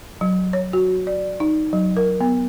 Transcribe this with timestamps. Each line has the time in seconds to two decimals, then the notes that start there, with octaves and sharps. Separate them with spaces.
0.21 F#3
0.53 C#5
0.73 F#4
1.07 D5
1.40 D#4
1.73 F#3
1.96 A#4
2.21 B3